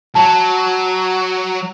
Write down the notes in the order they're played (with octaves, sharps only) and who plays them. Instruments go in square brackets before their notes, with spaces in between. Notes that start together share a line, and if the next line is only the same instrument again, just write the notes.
[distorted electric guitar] F#3 [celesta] A5